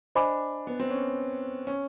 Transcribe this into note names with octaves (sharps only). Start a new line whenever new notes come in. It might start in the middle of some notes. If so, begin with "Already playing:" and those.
D4 C5 D#5 G#5 B5 D6
B3
C4
C#4
C#4